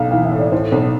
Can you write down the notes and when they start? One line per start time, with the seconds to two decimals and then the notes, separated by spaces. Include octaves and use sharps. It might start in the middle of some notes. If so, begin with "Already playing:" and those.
Already playing: B1 F5
0.11 E3 F5
0.25 E5
0.32 A2
0.39 D5
0.52 A2 C5
0.72 B1 C5